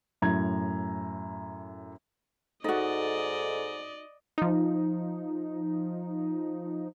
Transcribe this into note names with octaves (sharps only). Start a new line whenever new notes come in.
F#2 A2 A#5 G#6
G#2 D#4 F#4 A4 D5 D#5
F3 D#4